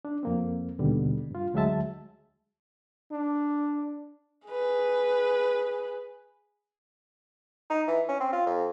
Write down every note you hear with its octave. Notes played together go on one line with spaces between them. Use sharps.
D4
F2 A#3 C4
D#2 B2 D3 G3
G2 F4
D2 F#3 G#3 E5 A5
D4
G#4 B4
D#4
E3
C#4
C4
F4
F2